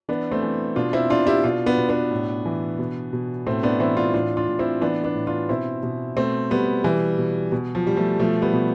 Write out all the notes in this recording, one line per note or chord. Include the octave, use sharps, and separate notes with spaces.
E3 B3 D4
A3 C4
E3
B2 D4 F4
C4 E4
B2 D4 F4
E4 G4
B2 D4 F4
B3 D4
B2
B3 D4
A2
E3
B2
B2
A2 A3 C4
B3 D4
E3 C4 E4
D4 F4
A2 D4 F4
D4 F4
A2
C4 E4
E3 B3 D4
B3 D4
A2
D4 F4
B2 C4 E4
B2
B2 A3 C4
B2 G3 B3
B2 E3 G3
B2
B2
F3
B2 G3
F3 A3
B2 F3 A3
G3 B3
B2